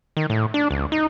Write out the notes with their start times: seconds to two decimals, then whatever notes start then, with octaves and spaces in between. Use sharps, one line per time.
0.17 D#3
0.30 A2
0.54 D4
0.71 C#2
0.92 D#4